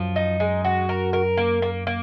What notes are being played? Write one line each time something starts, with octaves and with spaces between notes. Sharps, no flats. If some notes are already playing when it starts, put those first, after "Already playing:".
Already playing: F#2 F3
D#4
G#3
F#4
A#4
A#4
A#3
A#3
A#3